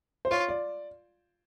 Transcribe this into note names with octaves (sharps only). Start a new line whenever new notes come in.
C5
F4 C#5
D5